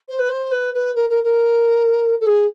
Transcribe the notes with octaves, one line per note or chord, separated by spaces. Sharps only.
C5
B4
C5
B4
B4
A#4
A#4
A#4
A4
G#4